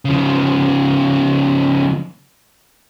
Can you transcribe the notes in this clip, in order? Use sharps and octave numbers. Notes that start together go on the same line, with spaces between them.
C#3 F3